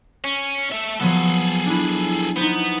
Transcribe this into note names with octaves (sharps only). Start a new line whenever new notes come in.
C#4
A4 E5
F3 F#3 B3 G#4 A4
D4 E4
B3 D#4 C5